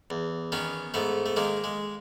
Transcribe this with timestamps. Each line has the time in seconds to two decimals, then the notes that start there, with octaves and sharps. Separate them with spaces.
0.10 E2
0.52 D#3 B3 C#4
0.94 G#2 A3 B3
1.26 A3
1.36 D#3 G#3 A#3
1.64 G#3